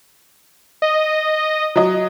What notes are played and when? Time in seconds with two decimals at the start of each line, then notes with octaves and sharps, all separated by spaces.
0.82 D#5
1.76 F#3 D#5